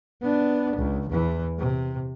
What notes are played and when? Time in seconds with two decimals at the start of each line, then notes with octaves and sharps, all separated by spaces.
0.22 B3 D4
0.76 C#2
1.09 E2 E3
1.58 C3